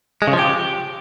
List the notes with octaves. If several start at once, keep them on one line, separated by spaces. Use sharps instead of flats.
G#3
C#3
F3
G4